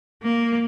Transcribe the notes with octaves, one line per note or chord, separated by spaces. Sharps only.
A#3